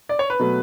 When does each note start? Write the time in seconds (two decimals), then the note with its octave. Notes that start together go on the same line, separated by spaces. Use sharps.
0.09 D5
0.19 C#5
0.30 B4
0.39 B2 F#3 A3